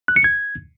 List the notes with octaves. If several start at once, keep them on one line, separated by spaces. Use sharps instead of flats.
F#6
C#7
G#6